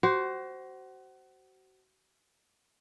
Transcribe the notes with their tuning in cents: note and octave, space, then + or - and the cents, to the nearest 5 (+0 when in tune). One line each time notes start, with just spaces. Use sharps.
F#4 +30 C5 +0